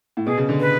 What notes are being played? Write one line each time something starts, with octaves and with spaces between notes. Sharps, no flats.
A2
B2 G#4
C#3
D3
B4